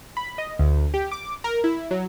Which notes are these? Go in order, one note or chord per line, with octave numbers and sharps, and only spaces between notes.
B5
D#5
D2
G4
D6
A#4
E4
F#3